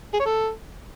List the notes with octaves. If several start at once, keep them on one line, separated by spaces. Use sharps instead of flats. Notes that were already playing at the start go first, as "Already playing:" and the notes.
G#4
C#5
A4